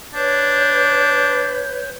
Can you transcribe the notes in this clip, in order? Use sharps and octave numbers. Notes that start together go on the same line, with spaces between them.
D4 B4 C#5 G6